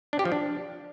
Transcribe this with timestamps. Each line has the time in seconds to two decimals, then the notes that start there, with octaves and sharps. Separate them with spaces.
0.13 D4
0.19 G4
0.25 F3
0.32 D4